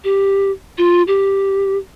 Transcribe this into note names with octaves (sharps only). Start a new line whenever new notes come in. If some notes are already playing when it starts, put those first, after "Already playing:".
G4
F4
G4